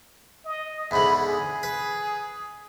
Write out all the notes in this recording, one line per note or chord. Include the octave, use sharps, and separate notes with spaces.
D#5
E2 G#2 D3 B5
G#4
B4